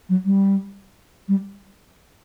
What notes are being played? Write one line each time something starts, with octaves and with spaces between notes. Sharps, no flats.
F#3
G3
G3